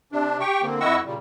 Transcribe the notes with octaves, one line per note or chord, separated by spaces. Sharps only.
C3 D4
G4 G5 C#6
D3 A#3 C4
F2 E4 D#5 F#5 C#6 E6
A#2 C#3 G3